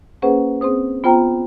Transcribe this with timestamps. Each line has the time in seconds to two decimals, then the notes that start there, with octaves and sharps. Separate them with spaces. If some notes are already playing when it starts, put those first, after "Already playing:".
0.22 A#3 C#4 G#4 B4 C5 F#5
0.61 C4 G#4 C5 D#6
1.04 B3 F4 C5 G5 A#5